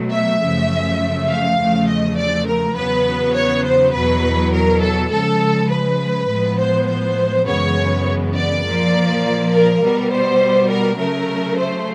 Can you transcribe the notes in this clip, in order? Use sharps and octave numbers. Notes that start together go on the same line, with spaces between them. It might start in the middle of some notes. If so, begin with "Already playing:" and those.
Already playing: B2 F#3 A3
E5
F#2 C#3 F3 A3
F5
E2 C#3 F3 A3
D#5
D5
A#4
E2 C#3 F#3 B3 B4
C#5
C5
E2 B2 F#3 B4
A#4
A4
C#3 F3 G#3 A4
B4
A2 F3 G#3 B3
C5
C5
F#2 C#3 E3 G#3 B3 C#5
D5
A#2 F3 A#3
A#4
B2 G3 B3
C5
A#4
C#3 F#3 A3 A#4
C5